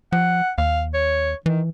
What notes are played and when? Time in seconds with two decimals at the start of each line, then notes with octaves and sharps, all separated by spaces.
0.12 F3 F#5
0.58 D#2 F5
0.94 C#5
1.46 D#3 E3